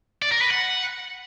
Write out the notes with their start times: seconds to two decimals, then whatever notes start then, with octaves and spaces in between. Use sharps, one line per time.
0.22 D5
0.32 A#4
0.41 B4
0.51 F#5